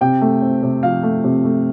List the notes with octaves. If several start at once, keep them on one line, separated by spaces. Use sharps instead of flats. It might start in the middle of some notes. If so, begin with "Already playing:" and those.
C3 G5
A3
C4
C3
F3 F5
A3
C3
A3